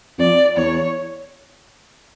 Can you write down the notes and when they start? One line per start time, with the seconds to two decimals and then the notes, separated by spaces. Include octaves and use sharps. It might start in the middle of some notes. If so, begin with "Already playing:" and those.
0.19 F2 D5
0.57 E2 C#5